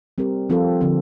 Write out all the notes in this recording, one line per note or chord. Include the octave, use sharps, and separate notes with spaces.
G3 C4 G4 A#4
F3 C4 F4 A4
D3 F3 C4